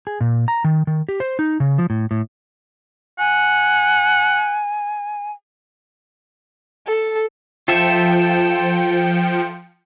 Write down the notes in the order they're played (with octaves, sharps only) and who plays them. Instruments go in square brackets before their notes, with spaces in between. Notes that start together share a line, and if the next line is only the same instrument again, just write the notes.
[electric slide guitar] G#4
A#2
A#5
D#3
D#3
G4
C5
D#4
C#3
F3
A2
A2
[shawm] F#5 [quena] G#5
[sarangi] A4
[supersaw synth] F3 G5 C#7 [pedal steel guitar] F4 A4 E5